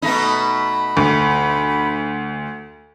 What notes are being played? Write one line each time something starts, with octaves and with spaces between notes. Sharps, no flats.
B2 A3 D#4 B5
D2